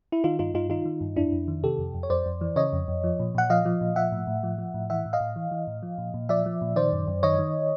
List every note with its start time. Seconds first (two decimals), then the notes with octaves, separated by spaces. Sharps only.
0.12 E4
0.24 D#3 D#4 F4
0.39 G2 D#4 F4
0.54 G2 D#4 F4
0.69 D#3 D#4 F4
0.85 D#3
1.01 G2
1.16 F2 D4 E4
1.32 F2
1.48 D#3
1.63 C3 G4 A4
1.78 F2
1.94 F2
2.03 C#5
2.10 F2 C5 D5
2.26 F2
2.41 E3
2.56 C#3 C#5 D#5
2.73 F2
2.88 F2
3.04 F3
3.19 A#2
3.35 A#2 F#5
3.50 F3 D#5 F5
3.65 F3
3.81 A#2
3.96 F3 E5 F#5
4.12 A2
4.27 A2
4.43 F3
4.58 F3
4.74 A2
4.90 E3 E5 F#5
5.05 A2
5.13 D#5 F5
5.20 A2
5.36 E3
5.51 E3
5.67 A2
5.83 F3
5.98 A#2
6.14 A#2
6.29 F3 D5 E5
6.46 F3
6.62 A#2
6.76 D#3 C5 D5
6.93 F#2
7.07 F#2
7.23 D#3 C#5 D#5
7.39 D#3